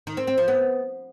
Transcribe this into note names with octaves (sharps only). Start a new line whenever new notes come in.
D#3
C4
C4
F3
B3